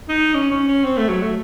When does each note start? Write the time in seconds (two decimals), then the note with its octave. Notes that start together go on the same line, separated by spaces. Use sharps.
0.09 D#4
0.34 C#4
0.51 C#4
0.68 C#4
0.84 C4
0.97 A3
1.09 F#3
1.23 A3